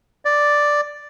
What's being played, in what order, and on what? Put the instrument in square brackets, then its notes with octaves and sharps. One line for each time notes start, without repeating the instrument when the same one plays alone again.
[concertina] D5